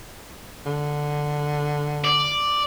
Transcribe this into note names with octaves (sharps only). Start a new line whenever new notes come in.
D3
D5